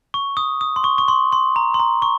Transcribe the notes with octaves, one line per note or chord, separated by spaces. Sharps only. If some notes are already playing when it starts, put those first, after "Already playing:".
C#6
D#6
D#6
C6
C#6
C#6
C6
C6
A#5
C6
A#5
C#6